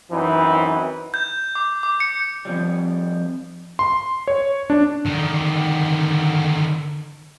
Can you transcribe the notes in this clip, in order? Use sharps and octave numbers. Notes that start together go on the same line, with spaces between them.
F#2 E3 C4 D#4
G6
D6
D6
C#7
F2 G#2 F3 G3
C6
C#5
D4
D3 D#3